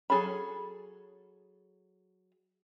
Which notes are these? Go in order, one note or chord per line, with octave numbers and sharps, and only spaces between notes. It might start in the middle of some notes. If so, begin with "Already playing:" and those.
F#3 G#4 A4 C#5 B5